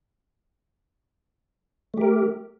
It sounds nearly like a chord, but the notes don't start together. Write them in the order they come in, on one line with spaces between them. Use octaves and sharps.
A3 G4 A#4